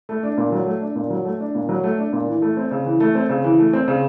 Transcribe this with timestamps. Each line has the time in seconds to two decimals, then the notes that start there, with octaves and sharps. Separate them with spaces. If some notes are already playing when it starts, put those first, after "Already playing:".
0.09 A3
0.23 D4
0.37 A#2
0.52 F#3
0.66 A3
0.81 D4
0.96 A#2
1.10 F#3
1.25 A3
1.40 D4
1.55 A#2
1.69 F#3
1.84 A3
1.98 D4
2.13 A#2
2.28 E3
2.42 A3
2.57 C4
2.71 C#3
2.86 E3
3.00 A3
3.15 C4
3.30 C#3
3.44 E3
3.59 A3
3.73 C4
3.88 C#3